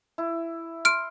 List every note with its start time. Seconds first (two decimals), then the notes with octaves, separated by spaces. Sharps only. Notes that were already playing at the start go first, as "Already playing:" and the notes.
0.18 E4
0.85 C6 F6 D7